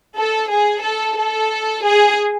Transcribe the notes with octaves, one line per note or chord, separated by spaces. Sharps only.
A4
G#4
A4
A4
G#4